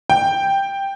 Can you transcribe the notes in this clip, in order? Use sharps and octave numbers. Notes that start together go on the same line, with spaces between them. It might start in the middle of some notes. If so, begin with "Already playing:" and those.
G5